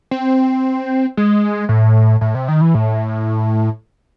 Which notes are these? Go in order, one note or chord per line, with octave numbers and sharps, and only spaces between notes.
C4
G#3
A2
A2
C3
D#3
E3
A2